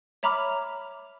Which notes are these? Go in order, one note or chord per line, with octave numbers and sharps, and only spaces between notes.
C#5 E5 A#5 B5 D6 F6